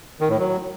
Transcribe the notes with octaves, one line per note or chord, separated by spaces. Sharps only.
D#3
A2
F#3